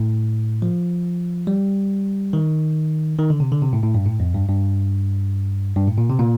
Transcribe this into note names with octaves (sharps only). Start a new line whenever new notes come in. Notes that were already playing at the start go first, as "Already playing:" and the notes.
Already playing: A2
F3
G3
D#3
D#3
D3
C3
D3
C3
A2
A2
G2
A2
F2
G2
G2
G2
A2
A#2
C3
A#2